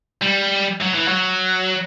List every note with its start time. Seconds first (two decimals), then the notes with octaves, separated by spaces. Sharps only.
0.21 G3
0.81 F#3
0.95 E3
1.08 F#3